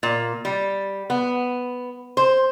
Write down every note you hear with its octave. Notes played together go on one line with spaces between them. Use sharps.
A#2
G3
B3
C5